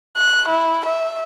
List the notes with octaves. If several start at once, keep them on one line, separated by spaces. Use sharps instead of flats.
F#6
E4
E5